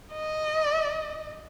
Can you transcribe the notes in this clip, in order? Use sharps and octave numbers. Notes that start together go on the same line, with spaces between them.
D#5